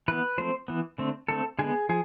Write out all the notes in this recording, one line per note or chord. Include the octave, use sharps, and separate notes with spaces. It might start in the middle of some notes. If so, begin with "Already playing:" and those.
E3 B3 B4
F3 A3 C4 C5
E3 B3
D3 A3 C4
D3 A3 C4 A4
D3 G#3 B3 G#4
F3 G#4